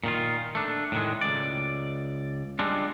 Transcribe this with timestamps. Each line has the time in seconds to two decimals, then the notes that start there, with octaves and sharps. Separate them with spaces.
0.04 A#2 D#3 F4
0.55 A3 D4
0.92 A2 D#3 G#3
1.21 C#2 D5
2.59 G3 G#3 C4 D4 F4